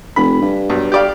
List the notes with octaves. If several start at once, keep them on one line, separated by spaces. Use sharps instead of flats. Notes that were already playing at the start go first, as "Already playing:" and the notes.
F1 B5
G2
B1
G4 D5 F5